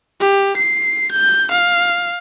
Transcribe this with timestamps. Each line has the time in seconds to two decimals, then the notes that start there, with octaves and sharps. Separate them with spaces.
0.21 G4
0.57 C7
1.12 G6
1.52 F5